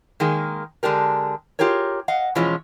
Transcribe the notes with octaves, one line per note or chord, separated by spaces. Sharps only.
D#3 G#3 A#3 G#4
D3 G#3 D4 G4 A#4
F4 G4 G#4 A#4 C#5
D#5 F5 F#5
B2 E3 F3 G#3 C#4 F4